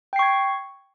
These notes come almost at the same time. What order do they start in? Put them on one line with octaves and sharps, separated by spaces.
G5 C7 C#6 G#6